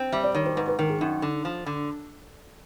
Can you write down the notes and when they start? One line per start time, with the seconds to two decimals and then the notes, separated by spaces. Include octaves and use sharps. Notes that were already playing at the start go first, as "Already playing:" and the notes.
Already playing: C4
0.12 G3 E5
0.24 D5
0.35 D#3 C#5
0.46 C5
0.57 G#2 B4
0.68 B4
0.79 D#3 A#4
0.90 G#4
1.01 F#2 D#4
1.22 D3
1.45 F3
1.66 D3